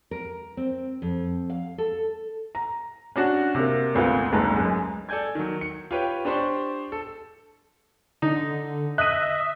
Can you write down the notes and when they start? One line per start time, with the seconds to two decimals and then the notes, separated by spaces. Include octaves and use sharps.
0.11 A#4
0.57 C4
1.02 F2
1.50 F5
1.78 A4
2.55 A#5
3.16 C#4 D4 F#4
3.55 C3 A#3
3.94 G#1 D2 B3 F4
4.32 F#1 D2 G#2 B4 A5 A#5
4.57 F#2 G#3
5.09 A4 D5 G#5 G6 G#6
5.35 D#3 F#3
5.61 C#7
5.91 F4 G4 B4 C#5 G5
6.25 D4 G4 C5 D5 C6 C#6
6.92 A4
8.22 D3 D#4
8.98 D#5 E5 F#6 D#7